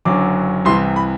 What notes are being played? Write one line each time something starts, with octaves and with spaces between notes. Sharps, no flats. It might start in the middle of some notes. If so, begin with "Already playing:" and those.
F#1 F#2 D3 F#3 D6
C2 C3 E3 C6
B5